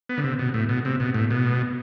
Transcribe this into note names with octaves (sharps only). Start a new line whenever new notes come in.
B3
D3
C3
B2
A2
B2
C3
B2
A2
B2